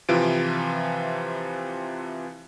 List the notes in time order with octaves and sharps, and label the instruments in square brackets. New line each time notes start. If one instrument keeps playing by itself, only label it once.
[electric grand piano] C3 E3 F3 F4 D7